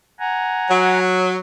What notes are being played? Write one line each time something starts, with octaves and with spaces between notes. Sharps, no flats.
F#5 G#5 A#5
F#3